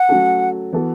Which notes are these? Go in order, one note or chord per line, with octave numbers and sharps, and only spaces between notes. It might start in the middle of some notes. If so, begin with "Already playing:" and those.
Already playing: F#5
F#3 A3 C#4 F#4 A4
E3 B3 F#4 A4